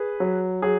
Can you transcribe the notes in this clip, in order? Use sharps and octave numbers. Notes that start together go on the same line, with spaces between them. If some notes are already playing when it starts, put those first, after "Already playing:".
Already playing: G#4 B4
F#3
F#3 G#4